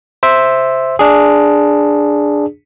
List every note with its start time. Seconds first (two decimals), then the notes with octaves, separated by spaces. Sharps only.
0.23 C5 E5
0.99 D4 G#4